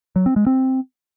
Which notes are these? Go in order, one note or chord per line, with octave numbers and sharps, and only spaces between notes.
F#3
C4
G#3
C4